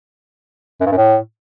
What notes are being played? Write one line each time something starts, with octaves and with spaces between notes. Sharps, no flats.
F#2
G2
F#2
A2